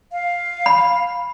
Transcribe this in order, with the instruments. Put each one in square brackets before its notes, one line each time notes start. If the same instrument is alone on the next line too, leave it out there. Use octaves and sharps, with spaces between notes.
[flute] F5
[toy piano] B5